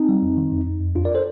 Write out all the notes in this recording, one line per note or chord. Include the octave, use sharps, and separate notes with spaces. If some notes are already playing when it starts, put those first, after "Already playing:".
Already playing: C4 D#4
G3
F2
D#3
F2
F2
F2
F2 D4 F4
A#4 D5
A4 C5